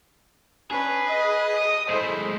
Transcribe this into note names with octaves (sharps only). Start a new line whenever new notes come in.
C#4 D4 G#4 B4
D#5
D#6
G#3 A3 E4 C5 D#5